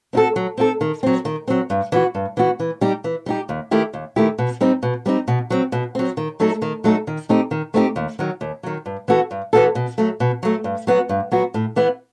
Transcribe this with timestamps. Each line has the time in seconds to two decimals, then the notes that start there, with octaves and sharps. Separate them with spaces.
0.13 C4 D#4 F#4 A4
0.36 F#3
0.57 C4 D#4 F#4 A4
0.81 D#3
1.03 F#3 C4
1.25 D#3
1.48 F#3 C4
1.70 G2
1.92 E3 B3 F#4
2.15 G2
2.37 E3 B3 F#4
2.60 E3
2.81 G3 D#4 G4
3.04 E3
3.26 G3 D#4 G4
3.49 D#2
3.71 D#3 A3 E4 G4
3.94 D#2
4.16 D#3 A3 E4 G4
4.38 B2
4.61 G3 C4 D#4
4.83 B2
5.06 G3 C4 D#4
5.28 B2
5.50 F#3 C4
5.72 B2
5.95 F#3 C4
6.17 D#3
6.40 F#3 A3 D#4 A4
6.62 D#3
6.84 F#3 A3 D#4 A4
7.07 D#3
7.29 A3 C4 D#4 G4
7.51 D#3
7.74 A3 C4 D#4 G4
7.96 D#2
8.19 D#3 F#3
8.41 D#2
8.63 D#3 F#3
8.86 G2
9.08 E3 B3 F#4 A4
9.31 G2
9.53 E3 B3 F#4 A4
9.75 B2
9.98 F#3 A3
10.20 B2
10.43 F#3 A3
10.64 G2
10.87 F#3 B3 F#4
11.09 G2
11.32 F#3 B3 F#4
11.54 A2
11.76 E3 B3 E4 B4